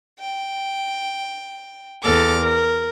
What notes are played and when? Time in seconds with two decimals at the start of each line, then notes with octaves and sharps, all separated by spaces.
0.19 G5
2.03 E2 A4 D6 F6
2.42 A#4